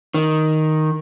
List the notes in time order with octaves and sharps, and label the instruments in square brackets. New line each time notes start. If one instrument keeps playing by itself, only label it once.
[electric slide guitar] D#3